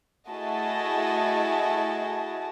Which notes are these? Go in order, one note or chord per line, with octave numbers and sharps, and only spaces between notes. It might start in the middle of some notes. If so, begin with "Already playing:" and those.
A3 E4 F#4 G#4 D#5 A5